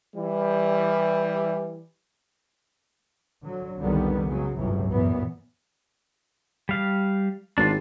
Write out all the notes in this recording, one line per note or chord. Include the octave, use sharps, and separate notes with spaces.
E3 G3
D3 F#3
C2 F2 D3 D#3 G3 B3
C#3 F#3 G#3
G1 C#2 A2 C3 E3 F#3
F#2 A#2 E3 B3
G3 F5
G#1 D4 F4